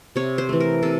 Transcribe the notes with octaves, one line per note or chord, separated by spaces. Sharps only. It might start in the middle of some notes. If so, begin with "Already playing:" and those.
C3 C#5
C5
E3 A3
A#4
C3 A4